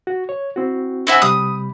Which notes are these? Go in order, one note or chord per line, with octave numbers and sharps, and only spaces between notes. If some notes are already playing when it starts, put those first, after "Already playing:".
F#4
C#5
C4 E4 F#4
C4 D4 E4 F#4 C5 G#5
C3 G3 B5 D#6